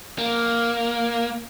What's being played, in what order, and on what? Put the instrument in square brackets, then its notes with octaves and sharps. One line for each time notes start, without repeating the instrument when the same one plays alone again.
[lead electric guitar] A#3